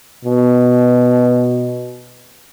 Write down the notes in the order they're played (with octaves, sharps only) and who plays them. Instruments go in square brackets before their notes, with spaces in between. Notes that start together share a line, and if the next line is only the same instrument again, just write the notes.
[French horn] B2